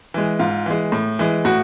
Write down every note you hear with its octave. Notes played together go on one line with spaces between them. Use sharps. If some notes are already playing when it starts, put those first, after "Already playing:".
E3 G#3
G#2 F4
E3 G#3
A2
E3 G#3
A2 F#4